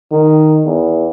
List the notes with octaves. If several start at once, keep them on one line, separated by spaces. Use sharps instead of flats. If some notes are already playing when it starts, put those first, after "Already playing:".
D#3
E2